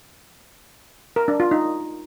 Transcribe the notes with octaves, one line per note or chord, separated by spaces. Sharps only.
A#4
D4
F4
D#4